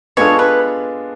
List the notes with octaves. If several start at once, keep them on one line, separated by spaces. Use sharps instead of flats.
G#3 B3 D4 F4 A4 C#5
B4